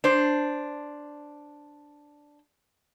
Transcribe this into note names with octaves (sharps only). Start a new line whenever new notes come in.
D4 C5